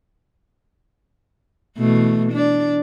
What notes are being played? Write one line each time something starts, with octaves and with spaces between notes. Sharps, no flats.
B2 E3 A3
D4 D5